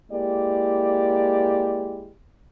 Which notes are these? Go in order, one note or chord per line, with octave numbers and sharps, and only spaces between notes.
G#3 A#3 E4 G4 D5